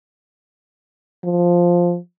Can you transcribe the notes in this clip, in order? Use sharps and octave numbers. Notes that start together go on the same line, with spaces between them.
F3